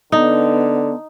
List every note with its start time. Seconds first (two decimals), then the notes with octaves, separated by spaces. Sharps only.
0.12 D3 B3 D#4